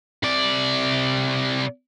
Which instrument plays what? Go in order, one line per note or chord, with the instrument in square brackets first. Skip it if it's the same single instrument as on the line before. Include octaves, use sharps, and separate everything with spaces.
[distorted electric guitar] C3 D5